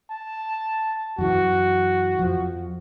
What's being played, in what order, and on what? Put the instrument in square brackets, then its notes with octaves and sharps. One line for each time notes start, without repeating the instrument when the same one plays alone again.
[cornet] A5
[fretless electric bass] F#2 E3 [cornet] F#4
[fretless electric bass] F2 F3